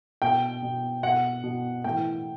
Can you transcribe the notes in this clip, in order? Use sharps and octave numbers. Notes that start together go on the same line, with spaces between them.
B2 G5
B2
B2 F#5
B2
A2 E3 G5